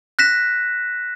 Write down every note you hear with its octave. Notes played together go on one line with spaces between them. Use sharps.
F#6 A#6 B6 E7